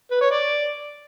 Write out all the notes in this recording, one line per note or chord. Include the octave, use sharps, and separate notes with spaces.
B4
C#5
D5